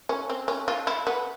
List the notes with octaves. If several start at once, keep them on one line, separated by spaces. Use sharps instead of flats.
C#4
C4
C#4
F4
E4
B3